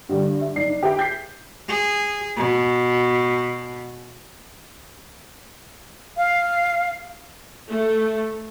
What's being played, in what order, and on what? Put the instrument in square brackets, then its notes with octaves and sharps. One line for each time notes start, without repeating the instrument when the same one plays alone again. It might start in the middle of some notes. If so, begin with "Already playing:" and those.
[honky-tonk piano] G2 D3 G3
E5
F#1 D4 D#4 C7
G4 G#4 B4 E5 G5
G6 B6 C7
[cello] G#4
B2
[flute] F5
[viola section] A3